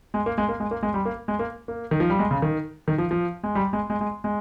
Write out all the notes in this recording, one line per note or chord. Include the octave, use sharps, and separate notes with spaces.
G#3
A#3
G#3
A#3
G#3
A#3
G#3
G3
A#3
G#3
A#3
A#3
D#3
F3
G3
G#3
C#3
D#3
D#3
F3
F3
G#3
G3
G#3
G#3
G#3
G#3